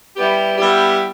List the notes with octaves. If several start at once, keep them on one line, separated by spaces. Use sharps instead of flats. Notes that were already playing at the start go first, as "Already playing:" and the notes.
G3 B3 E4 G4
G3 B3 E4 G4